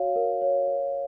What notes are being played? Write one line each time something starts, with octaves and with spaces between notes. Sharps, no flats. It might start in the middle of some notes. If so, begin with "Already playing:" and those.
Already playing: F#4 C#5 F5
A#4
C#5
A#4